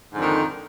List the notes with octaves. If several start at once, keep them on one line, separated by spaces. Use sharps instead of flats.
F2 G#2 D3 D#3